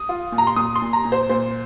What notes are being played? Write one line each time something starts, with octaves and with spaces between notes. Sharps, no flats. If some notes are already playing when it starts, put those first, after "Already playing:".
Already playing: D#6
F4
A#2
A#5
C6
A#2 D#6
C6
A#2
A#5
A#2
C5
A#2 C5